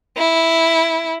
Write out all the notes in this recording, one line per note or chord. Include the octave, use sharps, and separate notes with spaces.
E4